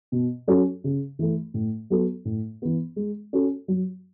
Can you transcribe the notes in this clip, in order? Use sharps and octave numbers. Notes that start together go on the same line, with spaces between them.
B2
F#3 C#4 F#4 A4
C#3
E3 A3
A2
F#3 B3 F#4 A4
A2
E3 B3
G#3
C#4 F#4 A4
F#3